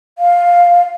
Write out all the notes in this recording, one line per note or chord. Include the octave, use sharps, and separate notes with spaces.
F5